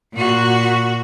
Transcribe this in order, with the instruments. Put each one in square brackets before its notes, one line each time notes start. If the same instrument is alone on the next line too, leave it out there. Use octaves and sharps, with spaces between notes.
[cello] A#2 F#4